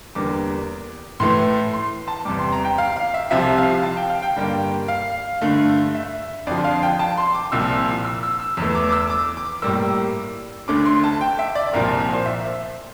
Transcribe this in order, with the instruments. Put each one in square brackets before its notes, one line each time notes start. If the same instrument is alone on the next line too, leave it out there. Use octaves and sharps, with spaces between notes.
[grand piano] E2 D3 G3 A#3 D6
A2 E3 A3 C6
C6
A5
E2 C3 G3 D6
C6
A#5
G5
F5
F5
E5
C2 C3 F3 E5
F5
A5
G5
F5
G5
G2 D3 G3 A#3
F5
G2 D3 A3
E5
F2 D3 F3 D5
F5
G5
A5
C6
D6
C2 A#2 F3 E6
E6
E6
E6
E2 E3 A3 E6
D6
D6
E6
D6
D6
A2 G3 A#3 E6
D2 D3 A3 D6
C6
A5
G5
E5
D5
C2 A#2 F3 A#4
A#4
C5
E5